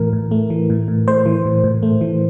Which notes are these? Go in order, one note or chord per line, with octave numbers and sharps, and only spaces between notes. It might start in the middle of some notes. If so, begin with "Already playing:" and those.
Already playing: A2 E3 A3 A#4
A2
A3
E3
A2
A2
A3 C5
E3
A2
A2
A3
E3